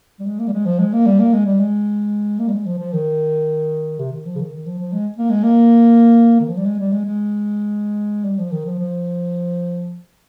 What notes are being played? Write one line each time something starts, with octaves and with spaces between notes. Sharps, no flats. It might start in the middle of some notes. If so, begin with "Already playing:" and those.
G3
G#3
A#3
G3
G#3
F3
G#3
A#3
G3
A#3
G#3
G3
G#3
A#3
G3
G#3
F3
F3
D#3
C3
D#3
F3
C#3
D#3
D#3
F3
F3
G#3
A#3
G#3
A#3
D#3
F3
G3
G#3
G3
G#3
G#3
G3
F3
D#3
F3
F3